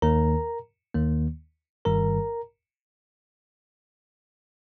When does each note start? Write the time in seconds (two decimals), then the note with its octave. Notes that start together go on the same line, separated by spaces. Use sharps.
0.02 D#2 D#3 A#3 A#4 A#5
0.94 D#2 D#3 A#3
1.85 G1 G2 D#3 G3 A#4 A#5